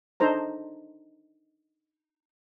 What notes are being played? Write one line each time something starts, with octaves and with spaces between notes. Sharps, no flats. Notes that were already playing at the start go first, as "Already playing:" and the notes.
D4 D#4 A4 C5 A#5